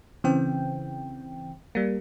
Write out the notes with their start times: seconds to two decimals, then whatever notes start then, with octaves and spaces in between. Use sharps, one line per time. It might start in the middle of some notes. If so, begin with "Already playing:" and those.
0.24 C#3 E3 C4 G5
1.75 G3 A#3